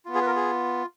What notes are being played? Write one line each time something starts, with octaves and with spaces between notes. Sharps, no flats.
B3 F4
G#4
B4
A#4
G#4